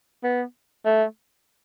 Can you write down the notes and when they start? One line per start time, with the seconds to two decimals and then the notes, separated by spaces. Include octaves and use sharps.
0.24 B3
0.85 A3